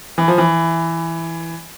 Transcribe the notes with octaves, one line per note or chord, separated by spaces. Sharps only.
E3
F3
E3